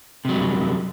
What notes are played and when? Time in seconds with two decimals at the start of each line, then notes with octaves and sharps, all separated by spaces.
0.25 C3
0.29 F#3
0.32 G3
0.36 F#2